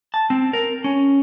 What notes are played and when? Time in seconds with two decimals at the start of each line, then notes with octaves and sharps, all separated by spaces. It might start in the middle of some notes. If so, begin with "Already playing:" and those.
0.14 A5
0.30 C4
0.53 A#4
0.84 C#4